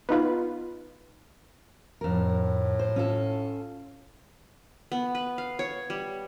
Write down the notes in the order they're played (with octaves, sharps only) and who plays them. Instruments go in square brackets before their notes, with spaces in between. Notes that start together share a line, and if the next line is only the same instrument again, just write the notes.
[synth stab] B3 D#4 F4 B4
[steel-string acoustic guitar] F2 A#4 [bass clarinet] A2
[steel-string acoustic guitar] C5
C#4 F4 A4
[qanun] B3
B4
F5
C#5
G3